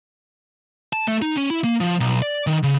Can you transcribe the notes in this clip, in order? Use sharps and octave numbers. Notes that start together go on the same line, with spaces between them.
A5
A3
D#4
C#4
E4
A#3
F3
B1
D5
D#3
C#3